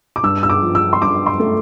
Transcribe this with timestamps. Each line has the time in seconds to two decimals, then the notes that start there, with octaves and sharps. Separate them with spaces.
0.16 D6
0.23 G2 E6
0.43 E6
0.50 D6
0.62 F3
0.75 E6
0.93 C6
1.02 G2 D6
1.26 C6
1.40 A3